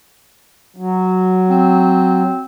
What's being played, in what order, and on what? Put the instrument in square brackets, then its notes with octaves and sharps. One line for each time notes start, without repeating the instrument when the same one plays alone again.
[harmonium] F#3
[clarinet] C4